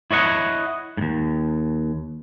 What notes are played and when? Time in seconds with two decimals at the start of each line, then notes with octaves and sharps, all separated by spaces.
0.11 E4 C#5 D#5 F#5
0.97 D#2 G#2